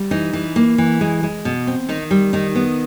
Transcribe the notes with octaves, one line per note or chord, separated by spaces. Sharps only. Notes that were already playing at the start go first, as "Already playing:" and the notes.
Already playing: G3
E3 D#4
E3
A#3
E3
G#3
G#3
B2
C4
D#3 D#4
G3
D#3 D#4
B3